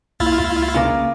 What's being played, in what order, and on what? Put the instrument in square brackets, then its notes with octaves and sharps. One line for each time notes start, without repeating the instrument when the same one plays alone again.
[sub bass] C2 [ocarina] A#3 [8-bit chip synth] E4 F4 A6
[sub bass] C#2
[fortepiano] C#3 A#4 D6